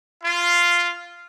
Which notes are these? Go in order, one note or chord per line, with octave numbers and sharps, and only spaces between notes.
F4